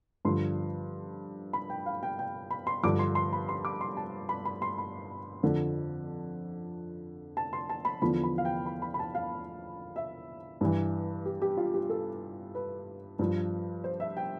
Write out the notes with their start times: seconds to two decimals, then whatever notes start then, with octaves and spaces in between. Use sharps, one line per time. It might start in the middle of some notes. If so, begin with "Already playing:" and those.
0.25 G2 D3 F3 C6
1.53 B5
1.70 G5
1.86 F5
2.03 G5
2.19 G5
2.51 B5
2.67 C6
2.83 G2 D3 F3 D6
2.99 C6
3.15 C6
3.33 B5
3.49 C6
3.65 D6
3.81 C6
3.97 A5
4.29 B5
4.45 B5
4.62 C6
4.78 B5
5.43 F2 D3 F3
7.37 A5
7.53 C6
7.69 A5
7.85 B5
8.02 E2 D3 F3 B5
8.24 B5
8.38 F5
8.45 G5
8.66 B5
8.82 B5
8.94 B5
8.99 A5
9.15 F5
9.96 E5
10.61 G2 E3
11.25 G4
11.42 G4
11.57 F4
11.74 G4
11.89 A4
12.55 B4
13.19 G2 F3
13.84 C5
14.00 E5
14.17 G5